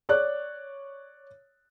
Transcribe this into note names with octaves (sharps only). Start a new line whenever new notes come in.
C#5 D5 F#6